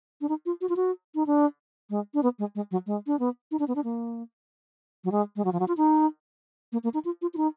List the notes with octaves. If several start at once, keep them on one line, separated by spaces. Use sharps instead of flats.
D4
D#4
F4
F#4
F4
F#4
D#4
D4
G#3
D4
B3
G#3
G#3
F#3
G#3
D4
B3
D#4
D4
B3
D4
A#3
F#3
G#3
G#3
F#3
F3
F#3
F4
D#4
A#3
A#3
D#4
F4
F4
F4
D#4